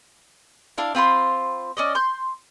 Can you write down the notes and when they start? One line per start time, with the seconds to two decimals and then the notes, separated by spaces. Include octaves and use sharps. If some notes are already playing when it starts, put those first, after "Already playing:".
0.78 D4 E4 F5
0.95 C4 F4 B5 C6
1.77 C#4 D5 D#5
1.95 C6 G6